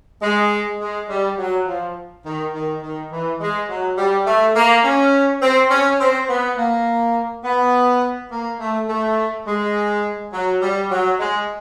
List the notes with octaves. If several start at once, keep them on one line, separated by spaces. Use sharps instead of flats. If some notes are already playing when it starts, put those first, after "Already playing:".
G#3
G#3
G3
F#3
F3
D#3
D#3
D#3
E3
G#3
F#3
G3
A3
A#3
C#4
C4
C#4
C4
B3
A#3
B3
A#3
A3
A3
G#3
F#3
G3
F#3
G#3